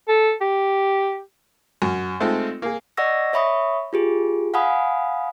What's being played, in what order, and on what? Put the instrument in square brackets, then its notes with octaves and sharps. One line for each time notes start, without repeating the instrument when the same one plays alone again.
[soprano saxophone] A4
G4
[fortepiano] F#2
G#3 A3 C4 D#4 F4 A4
A#3 G#4
[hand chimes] D5 D#5 F#5 C#6 E6 A#6
C#5 E5 B5 C#6 D#6
F4 G4 G#4
F5 F#5 G#5 B5 D#6